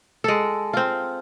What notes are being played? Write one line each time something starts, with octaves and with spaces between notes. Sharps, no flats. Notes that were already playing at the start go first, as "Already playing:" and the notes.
G#3 A4
C4 F4